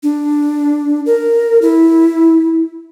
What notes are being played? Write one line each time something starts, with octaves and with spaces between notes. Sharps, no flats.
D4
A#4
E4